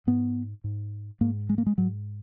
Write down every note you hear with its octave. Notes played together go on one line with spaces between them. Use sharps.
G#2 B3
G#2
G#2 A#3
G#3
A#3
G#3
G#2 F#3